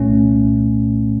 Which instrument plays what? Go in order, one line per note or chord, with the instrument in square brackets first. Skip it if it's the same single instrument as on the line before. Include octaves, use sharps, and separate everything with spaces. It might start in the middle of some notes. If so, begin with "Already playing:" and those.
Already playing: [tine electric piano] C2 A#2 A3 C#4